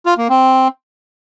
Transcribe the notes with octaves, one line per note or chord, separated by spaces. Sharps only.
F4
A#3
C4